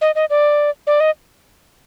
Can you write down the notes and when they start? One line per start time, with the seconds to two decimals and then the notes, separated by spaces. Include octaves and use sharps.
0.01 D#5
0.15 D#5
0.30 D5
0.87 D5
1.00 D#5